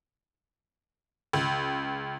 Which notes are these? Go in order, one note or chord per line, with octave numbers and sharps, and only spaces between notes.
C#2